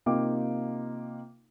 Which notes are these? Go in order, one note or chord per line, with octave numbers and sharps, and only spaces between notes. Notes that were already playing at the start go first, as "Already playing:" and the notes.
C3 A#3 D#4 F4 G5 D6